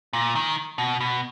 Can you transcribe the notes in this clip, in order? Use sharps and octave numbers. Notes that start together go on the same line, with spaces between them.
A#2
D#3
B2
B2